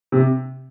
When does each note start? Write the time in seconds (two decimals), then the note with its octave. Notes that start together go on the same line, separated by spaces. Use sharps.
0.12 C3